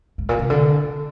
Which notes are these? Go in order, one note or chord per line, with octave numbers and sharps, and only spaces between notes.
G#2
A#2
C3
D3